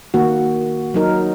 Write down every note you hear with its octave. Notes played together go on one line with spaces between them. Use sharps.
D#3 A#3 F#4
F#3 D#4 A#4